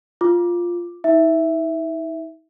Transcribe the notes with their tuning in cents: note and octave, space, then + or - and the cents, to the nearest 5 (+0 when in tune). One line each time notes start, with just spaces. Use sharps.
F4 +0 D6 +0
D#4 +45 E5 +0